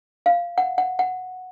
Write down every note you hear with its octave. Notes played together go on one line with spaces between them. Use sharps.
F5
F#5
F#5
F#5